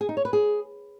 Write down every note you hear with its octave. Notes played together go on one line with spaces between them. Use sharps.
G#4
D#4
C#5
B4
G#4